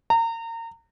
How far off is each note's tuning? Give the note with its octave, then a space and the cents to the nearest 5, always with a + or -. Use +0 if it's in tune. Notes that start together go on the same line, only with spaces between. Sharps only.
A#5 -30